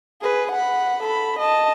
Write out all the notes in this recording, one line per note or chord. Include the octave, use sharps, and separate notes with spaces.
G#4 B4
F#5 B5
A4 B5
D#5 A5